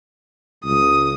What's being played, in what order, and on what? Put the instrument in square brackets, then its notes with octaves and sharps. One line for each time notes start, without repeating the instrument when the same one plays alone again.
[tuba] C#2 [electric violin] D#6